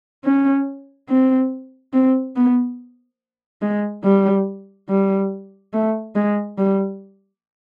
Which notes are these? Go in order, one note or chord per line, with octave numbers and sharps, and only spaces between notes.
C#4
C4
C4
B3
G#3
G3
G3
A3
G#3
G3